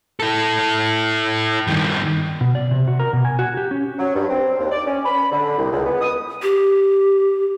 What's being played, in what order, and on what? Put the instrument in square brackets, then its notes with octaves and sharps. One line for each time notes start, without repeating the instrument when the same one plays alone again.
[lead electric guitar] E4 A4
G2 D#3
[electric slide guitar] B2
D5
C3
F#4
A#4
B2
G#5
F#4
G4
C#4
[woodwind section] F#3
G2
C4
D#2
D5
C#4
B5
D3
C2
C#2
B3
D#6
[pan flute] G4